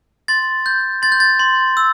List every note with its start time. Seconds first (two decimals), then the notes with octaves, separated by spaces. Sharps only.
0.28 C6 A6
0.66 G6
1.02 C6 A6
1.12 G6
1.20 A6
1.39 C6
1.77 E6